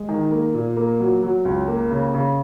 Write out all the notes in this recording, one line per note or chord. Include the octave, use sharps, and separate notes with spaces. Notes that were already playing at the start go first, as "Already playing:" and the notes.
Already playing: G#3
D#3
A#3
A#2
A#3
F#3
F#3
C#2
A#3
C#3
C#3